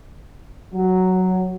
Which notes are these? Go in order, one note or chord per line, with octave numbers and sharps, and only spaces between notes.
F#3